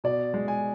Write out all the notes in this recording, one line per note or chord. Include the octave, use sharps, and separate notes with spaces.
B2 D5
G#3
G#5